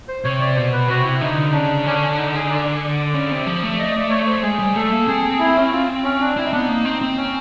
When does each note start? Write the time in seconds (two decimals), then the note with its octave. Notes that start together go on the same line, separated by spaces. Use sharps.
0.08 C5
0.24 C3 C#5
0.40 D5
0.56 B2 C5
0.73 B4
0.88 C3 F#4
1.04 E4
1.21 D3 D#4
1.53 C#3 D4
1.86 D3 C#4
2.18 D#4
2.34 G#4
2.50 D5
3.14 C#3
3.31 C3
3.46 F3
3.63 A3
3.79 D#5
3.95 D5
4.10 C#5
4.27 C5
4.43 G#3 G#4
4.59 G3
4.76 A3 A4
4.91 A#3
5.07 C4 G#4
5.24 G#4
5.39 E4
5.56 C#4
5.72 F4
6.04 C#4
6.21 D4
6.37 C4 E4
6.44 D#4
6.52 B3 D4
6.60 D#4
6.69 A#3
6.85 C4
7.01 C4
7.17 C#4